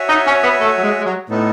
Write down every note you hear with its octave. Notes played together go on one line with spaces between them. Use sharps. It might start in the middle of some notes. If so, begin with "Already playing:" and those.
Already playing: F#4 C#5 E5 G#5
D#4
C#4
B3
A3
F#3
G#3
G#3
F#3
A2 B3 D#4 A4